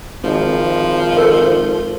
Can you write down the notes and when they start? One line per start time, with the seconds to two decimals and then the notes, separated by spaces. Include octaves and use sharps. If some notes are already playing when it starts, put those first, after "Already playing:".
0.24 G#1 F3
1.18 A4 A#4